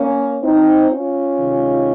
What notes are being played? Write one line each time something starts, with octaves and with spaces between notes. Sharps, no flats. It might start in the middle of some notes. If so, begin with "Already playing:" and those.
Already playing: A#3 C#4
C4 D#4
C#4 F4
C3 D#3 G#3